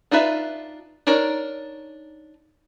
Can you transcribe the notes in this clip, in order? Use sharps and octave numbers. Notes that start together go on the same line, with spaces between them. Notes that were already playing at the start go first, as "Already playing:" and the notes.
D4 D#4 F4 B4 E5
D4 D#4 A#4 C#5